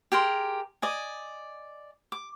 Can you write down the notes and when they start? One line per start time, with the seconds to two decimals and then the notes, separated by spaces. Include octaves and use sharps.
0.12 G4 G#4 A#4 C6
0.82 D5 D#5 G#5
2.12 D6